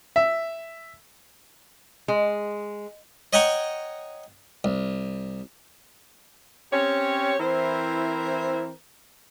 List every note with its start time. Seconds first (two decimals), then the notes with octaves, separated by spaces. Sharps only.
0.16 E5
2.08 G#3
3.33 C#5 D#5 F#5 G5 A#5 C#6
4.64 C2
6.72 C4 C#4 G4 C#5
7.40 E3 C4 E4 A#4 C5